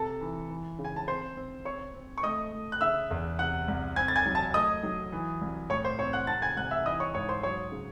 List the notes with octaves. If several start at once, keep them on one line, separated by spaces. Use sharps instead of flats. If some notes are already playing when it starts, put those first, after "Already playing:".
Already playing: C3 A4 A5
E3
E3
C#3
G#5
A5
C4 C5 C6
C4
C4 C#5 C#6
C4
C#6
A3 D#5 D#6
A3
F#6
C#3 E5 E6
E2
C3 F#5 F#6
C2
C4 G#5 G#6
A6
G#5 G#6
F#3
A5 A6
A3 D#5 D#6
F#3
E3
C2
A2 C#5 C#6
C5 C6
C4 C#5 C#6
F#5 F#6
C3 A5 A6
G#5 G#6
C2 F#5 F#6
E5 E6
E3 D#5 D#6
C#5 C#6
G#2 C#5 C#6
C5 C6
F#3 C#5 C#6
C#3